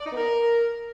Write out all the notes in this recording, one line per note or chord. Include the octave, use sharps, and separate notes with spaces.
D5
D#4
B3
A#4